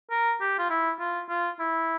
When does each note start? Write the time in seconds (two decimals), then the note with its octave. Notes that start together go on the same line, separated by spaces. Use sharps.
0.11 A#4
0.41 G4
0.59 F4
0.70 E4
1.00 F4
1.29 F4
1.59 E4